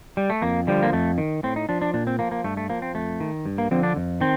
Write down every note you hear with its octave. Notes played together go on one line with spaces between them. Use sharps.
G3
A3
F2 A#3
D3 F3 G3
A#3
F2 A3
D#3
A2 C4
D#4
F3 D4
D4
A#2 D4
C4
F3 A#3
A#3
G2 A3
A3
F3 A#3
C4
F2 A3
D#3
G2
A#3
D3 F3 C4
D4
F2
D#3 C4